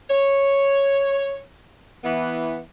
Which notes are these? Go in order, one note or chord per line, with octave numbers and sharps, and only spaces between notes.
C#5
E3 B3